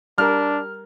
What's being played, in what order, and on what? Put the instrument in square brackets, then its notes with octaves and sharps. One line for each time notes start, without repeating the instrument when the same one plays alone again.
[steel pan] G3 A#4 [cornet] D4 [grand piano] F6